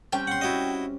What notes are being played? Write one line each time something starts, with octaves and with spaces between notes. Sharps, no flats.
G3 C4 C#4 G5
F#5 C6
E4 F#4 D#5